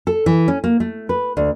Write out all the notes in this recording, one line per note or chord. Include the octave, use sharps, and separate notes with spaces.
A4
E3
C#4
A#3
A3
B4
D2